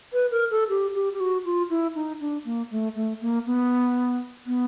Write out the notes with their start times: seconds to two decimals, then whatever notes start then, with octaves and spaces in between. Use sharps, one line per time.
0.13 B4
0.31 A#4
0.51 A4
0.69 G4
0.95 G4
1.13 G4
1.20 F#4
1.45 F4
1.70 E4
1.95 D#4
2.20 D4
2.45 A#3
2.71 A3
2.96 A3
3.21 A#3
3.46 B3
4.47 B3